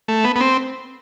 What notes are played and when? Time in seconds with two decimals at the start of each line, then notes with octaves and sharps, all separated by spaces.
0.08 A3
0.24 B3
0.36 B3
0.40 C4